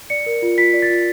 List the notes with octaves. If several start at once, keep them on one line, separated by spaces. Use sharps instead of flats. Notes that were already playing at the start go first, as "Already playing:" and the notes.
D5 C#7
A#4
F4
F4 B6
D5
A6
F4